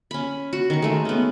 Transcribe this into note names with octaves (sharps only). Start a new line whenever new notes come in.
C#4 B5
F#4
D#3 C#6
G#3 A3 D#4
B3 C#4